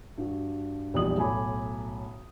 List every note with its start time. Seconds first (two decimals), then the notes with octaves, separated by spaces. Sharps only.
0.18 G2 F#4
0.94 A#1 E2 G3 D#4 D#6 F#7
1.18 B1 A2 G#5 B5 D6